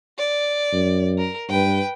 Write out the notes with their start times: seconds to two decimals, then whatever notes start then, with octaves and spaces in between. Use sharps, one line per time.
0.18 D5
0.73 F#2
1.18 A#4
1.50 G2 B4 G5